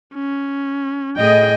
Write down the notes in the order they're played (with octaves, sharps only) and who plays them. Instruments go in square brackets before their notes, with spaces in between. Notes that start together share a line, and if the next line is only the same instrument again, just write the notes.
[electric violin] C#4
[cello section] A2 D#5 [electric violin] G#4 G5